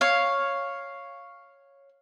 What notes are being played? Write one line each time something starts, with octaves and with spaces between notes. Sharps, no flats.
C#5 F5